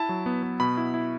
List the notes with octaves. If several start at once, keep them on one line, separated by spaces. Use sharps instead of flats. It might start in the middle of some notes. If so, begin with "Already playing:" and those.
Already playing: E4 A5
F#3
B3
B3
B2 B5
E4
E4